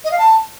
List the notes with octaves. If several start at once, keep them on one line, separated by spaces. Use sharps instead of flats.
D#5
F5
A5